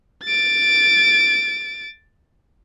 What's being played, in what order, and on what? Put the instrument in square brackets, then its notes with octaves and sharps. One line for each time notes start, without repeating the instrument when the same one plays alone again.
[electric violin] A6 D7